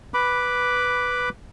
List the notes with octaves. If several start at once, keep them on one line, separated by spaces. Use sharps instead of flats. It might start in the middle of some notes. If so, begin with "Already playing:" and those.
B4 B5 D6